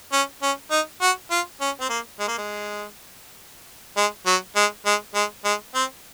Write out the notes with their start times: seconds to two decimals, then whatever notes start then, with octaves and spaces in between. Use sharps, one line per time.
0.13 C#4
0.42 C#4
0.71 D#4
1.02 F#4
1.31 F4
1.61 C#4
1.81 C4
1.90 A#3
2.20 G#3
2.28 A#3
2.38 G#3
3.97 G#3
4.26 F#3
4.56 G#3
4.86 G#3
5.15 G#3
5.45 G#3
5.75 C4